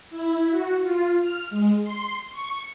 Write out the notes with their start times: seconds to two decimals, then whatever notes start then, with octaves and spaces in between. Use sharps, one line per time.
0.10 E4
0.50 F#4
0.83 F4
1.21 F6
1.50 G#3
1.83 C6
2.31 C#6